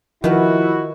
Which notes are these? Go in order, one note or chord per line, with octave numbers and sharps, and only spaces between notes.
D#3 F3 E4 F#4 B4